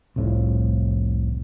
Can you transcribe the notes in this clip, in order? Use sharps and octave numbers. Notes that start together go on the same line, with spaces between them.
F1 C2 A2 F3